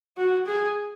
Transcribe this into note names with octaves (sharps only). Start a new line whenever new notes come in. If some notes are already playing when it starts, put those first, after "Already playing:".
F#4
G#4